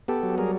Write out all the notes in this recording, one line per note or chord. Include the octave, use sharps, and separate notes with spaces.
B3 G4 A4
F#3
G3 G#4 A#4